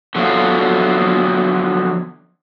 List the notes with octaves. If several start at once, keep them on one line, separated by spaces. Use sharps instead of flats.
D3 F3 F#3 B3 A4 F5